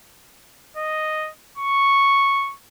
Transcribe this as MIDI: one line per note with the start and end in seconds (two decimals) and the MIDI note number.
0.77 1.30 75
1.58 2.54 85